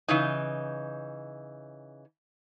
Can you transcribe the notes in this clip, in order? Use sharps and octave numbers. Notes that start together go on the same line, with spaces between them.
C#3 E3 D#4